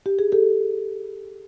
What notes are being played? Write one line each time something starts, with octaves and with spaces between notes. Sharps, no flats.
G4
G#4
G4 A4